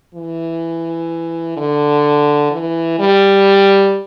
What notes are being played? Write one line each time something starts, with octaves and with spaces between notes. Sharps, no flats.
E3
D3
E3
G3